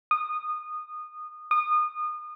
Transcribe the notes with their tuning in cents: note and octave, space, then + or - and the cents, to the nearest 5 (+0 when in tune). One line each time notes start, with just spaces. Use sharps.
D#6 -20
D#6 -30